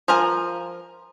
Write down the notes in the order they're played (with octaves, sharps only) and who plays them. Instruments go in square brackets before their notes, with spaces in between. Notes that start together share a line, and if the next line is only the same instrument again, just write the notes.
[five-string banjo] F3 F4 A#4 G#5